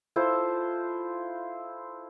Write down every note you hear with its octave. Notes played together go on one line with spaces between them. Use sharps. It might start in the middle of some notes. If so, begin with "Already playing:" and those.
E4 F4 A4 C5